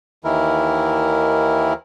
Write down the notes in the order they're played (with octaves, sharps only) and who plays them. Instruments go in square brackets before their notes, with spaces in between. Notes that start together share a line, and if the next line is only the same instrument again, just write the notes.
[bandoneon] D#2 D#3 E3 E4 A#4